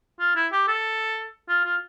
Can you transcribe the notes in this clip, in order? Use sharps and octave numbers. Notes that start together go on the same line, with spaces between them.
F4
E4
G4
A4
F4
F4